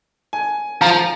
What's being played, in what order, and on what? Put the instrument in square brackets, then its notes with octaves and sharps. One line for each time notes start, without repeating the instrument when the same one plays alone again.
[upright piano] G#5
[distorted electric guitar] F3 [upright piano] A#5